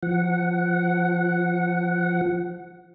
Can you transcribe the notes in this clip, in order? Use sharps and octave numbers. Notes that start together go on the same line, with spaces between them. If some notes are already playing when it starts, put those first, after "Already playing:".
F3 F#5